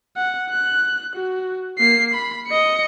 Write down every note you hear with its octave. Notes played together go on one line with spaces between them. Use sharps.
F#5
F#6
F#4
A#3 C7
B5
D#5 C#7